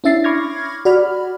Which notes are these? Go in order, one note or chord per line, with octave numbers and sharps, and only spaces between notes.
C#4 D4 E4 E5 A6 C7
B5 C#6 D6 F6 G#6 A#6
F#4 D5 B5 F6